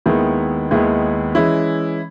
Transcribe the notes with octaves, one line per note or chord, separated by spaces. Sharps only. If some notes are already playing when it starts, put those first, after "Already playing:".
D#2 D#3 G#3 B3 E4
D#2 D#3 G#3 B3 E4
E3 G#3 C#4 E4